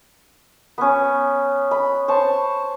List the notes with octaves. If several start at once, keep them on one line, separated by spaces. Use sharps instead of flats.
B3 C#4
B5
C5 C#5 A5